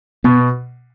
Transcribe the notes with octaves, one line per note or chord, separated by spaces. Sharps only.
B2 B3